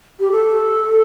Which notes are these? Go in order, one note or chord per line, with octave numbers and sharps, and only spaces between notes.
G4
A4